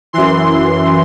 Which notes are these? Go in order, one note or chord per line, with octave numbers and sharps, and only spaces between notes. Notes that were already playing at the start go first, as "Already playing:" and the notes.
F#2 E3 C6